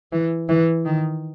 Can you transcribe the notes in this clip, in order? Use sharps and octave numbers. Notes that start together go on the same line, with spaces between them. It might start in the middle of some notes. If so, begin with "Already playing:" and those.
E3
E3
D#3